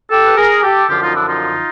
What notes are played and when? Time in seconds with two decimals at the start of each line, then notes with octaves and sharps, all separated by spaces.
0.11 G4 A4
0.27 B4
0.37 G#4 A#4
0.63 G4 A4
0.89 F#2 D3 F3 F4 G4
1.02 D#4 F4
1.15 D4 E4
1.28 D#4 F4